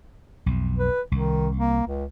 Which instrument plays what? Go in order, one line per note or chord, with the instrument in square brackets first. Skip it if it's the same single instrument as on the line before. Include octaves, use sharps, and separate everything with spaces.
[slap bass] B1 F2
[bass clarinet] B4
[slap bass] C2 [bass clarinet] D#3
[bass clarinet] A#3
C#2